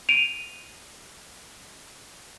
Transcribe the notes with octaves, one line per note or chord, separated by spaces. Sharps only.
D7 D#7 F7